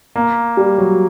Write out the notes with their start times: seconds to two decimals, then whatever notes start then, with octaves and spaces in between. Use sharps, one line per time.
0.16 A#3
0.57 G3
0.78 F#3